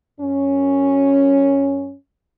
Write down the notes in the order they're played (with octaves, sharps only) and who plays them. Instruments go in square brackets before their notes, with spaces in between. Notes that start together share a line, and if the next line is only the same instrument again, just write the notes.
[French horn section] F#2 C#4